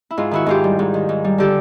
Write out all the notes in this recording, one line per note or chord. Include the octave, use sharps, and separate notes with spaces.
E4
G#2 F4
D#3 E4 F#4
G#2 F4 G4
G3
G#2
D#3
G#2
G3
D3 G4 A4